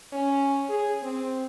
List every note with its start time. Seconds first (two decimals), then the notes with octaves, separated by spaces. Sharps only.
0.12 C#4
0.69 G#4
1.03 C4